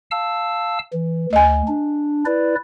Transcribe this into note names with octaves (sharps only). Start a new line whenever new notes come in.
F5 A5 E6
E3
D2 D#5 G#5
D4
E4 B4 D5